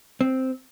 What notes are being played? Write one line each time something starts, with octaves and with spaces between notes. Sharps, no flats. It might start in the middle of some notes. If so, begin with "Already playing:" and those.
C4